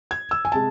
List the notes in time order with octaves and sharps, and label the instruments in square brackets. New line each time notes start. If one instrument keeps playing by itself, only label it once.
[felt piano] G#6
E6
G#5
C3 G#3 A5